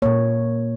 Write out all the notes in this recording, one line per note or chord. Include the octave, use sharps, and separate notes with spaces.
A#2 A#3 C#5